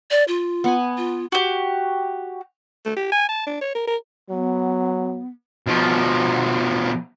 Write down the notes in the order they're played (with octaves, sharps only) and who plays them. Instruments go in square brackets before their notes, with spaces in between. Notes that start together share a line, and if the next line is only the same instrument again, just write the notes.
[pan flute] D5
F4
[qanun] B3 F#5 G#5
[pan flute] F4
[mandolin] F#4 G4
[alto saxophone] A3
G4
G#5
A5
D4
C#5
A#4
A#4
[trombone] F#3 [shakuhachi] B3
[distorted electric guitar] B2 F3